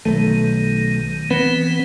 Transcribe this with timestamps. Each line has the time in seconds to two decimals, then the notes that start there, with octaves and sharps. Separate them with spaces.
0.05 B1 D#3 A3
1.31 E3 B3 C4 B4